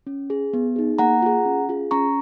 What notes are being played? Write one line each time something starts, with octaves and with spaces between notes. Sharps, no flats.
C#4
G#4
B3
D#4 G#4
A#3 F#5 A#5
F4 G#4
C#4
F4 G#4
C#4 A#5 C#6